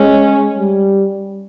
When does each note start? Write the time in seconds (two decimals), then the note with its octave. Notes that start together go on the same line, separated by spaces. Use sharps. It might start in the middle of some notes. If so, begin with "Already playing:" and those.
Already playing: G#3 C#4
0.58 G3